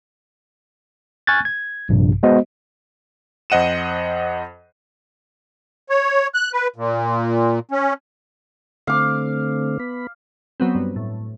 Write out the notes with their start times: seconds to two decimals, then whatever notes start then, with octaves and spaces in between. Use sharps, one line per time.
1.27 G#5 C#6 F6 F#6 G#6 A6
1.45 G#6
1.89 A#1 G2 C3
2.23 G#3 B3 F#4 C5 D#5
3.50 F2 C5 D#5 F#5 D#7 E7
5.89 C#5
6.34 F#6
6.53 B4
6.76 A#2
7.71 C#4
8.87 D3 A3 C4 F5 D6
9.79 B3 B5
10.60 F#3 B3 C4
10.75 G2
10.96 A2